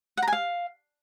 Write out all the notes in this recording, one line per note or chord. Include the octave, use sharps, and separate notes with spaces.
F#5
A#5
G#5
F5